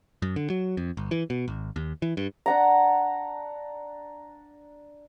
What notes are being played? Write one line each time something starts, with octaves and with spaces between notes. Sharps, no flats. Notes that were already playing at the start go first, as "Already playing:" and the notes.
F#2
D3
F#3
F2
G1
E3
B2
G#1
D#2
E3
G2
D4 F#5 A#5